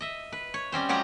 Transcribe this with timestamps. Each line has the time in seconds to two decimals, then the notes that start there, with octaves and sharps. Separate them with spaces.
0.01 D#5 E5
0.32 B4
0.54 C#5
0.72 G3 C4 C#4 C5
0.89 F3 F#3 G#3 G4 F#5 A#5